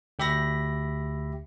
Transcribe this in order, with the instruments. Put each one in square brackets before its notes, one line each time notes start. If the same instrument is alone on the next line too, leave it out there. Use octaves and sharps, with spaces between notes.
[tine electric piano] D2 G4 E5 B5 A#6